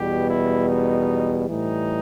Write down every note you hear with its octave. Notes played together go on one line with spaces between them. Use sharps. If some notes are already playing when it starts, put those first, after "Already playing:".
Already playing: E2 B2 G3 G4
E4
D#4
A2 E3 G3 D#4